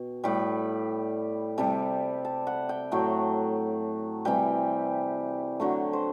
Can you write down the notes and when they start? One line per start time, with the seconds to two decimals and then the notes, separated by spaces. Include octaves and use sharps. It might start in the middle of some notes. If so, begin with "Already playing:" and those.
Already playing: B2 G5
0.24 A2 G3 B5
1.58 C3 G3 A5
2.25 A5
2.47 F#5
2.69 G5
2.92 A2 F#3 A3 G5
4.25 C3 E3 G3 G5
5.60 D3 F#3 A3 G5
5.93 C5